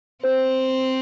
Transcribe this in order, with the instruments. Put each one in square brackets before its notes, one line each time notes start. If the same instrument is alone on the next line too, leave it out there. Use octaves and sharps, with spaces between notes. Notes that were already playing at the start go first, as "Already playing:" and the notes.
[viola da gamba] C4 [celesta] C5